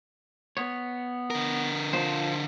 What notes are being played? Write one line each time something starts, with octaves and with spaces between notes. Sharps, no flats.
B3 C#5
D3 A#4
F3 C5